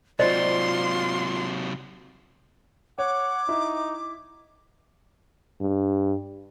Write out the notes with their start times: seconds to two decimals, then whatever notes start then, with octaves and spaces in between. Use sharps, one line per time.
0.19 C3 F#3 F4 C5 D5 D#5 C6
2.98 C#5 F#5 D6
3.49 D#4 E4
5.61 G2